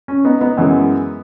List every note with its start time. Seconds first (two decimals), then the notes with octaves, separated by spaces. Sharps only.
0.08 C#4
0.25 B3 D#4
0.41 B3 D#4
0.57 F#2 E3 G#3